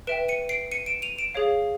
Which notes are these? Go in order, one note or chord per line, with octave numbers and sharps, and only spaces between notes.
B4 E5 G5 D7 E7
C#7 D#7
C7 D7
C#7 D#7
D7 E7
D#7 F7
D7 E7
G#4 C#5 F5